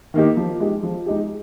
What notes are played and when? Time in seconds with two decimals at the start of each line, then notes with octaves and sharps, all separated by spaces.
0.14 D#3 A#3 D#4 G4
0.37 F3
0.60 G#3 D#4 G4
0.83 F3
1.06 G#3 D#4 G4